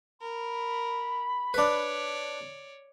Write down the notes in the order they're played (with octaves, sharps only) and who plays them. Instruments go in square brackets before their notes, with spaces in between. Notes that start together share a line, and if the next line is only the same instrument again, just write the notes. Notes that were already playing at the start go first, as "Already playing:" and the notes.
[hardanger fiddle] A#4 [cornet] B5
[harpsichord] D4 B4 [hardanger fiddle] C#5 D5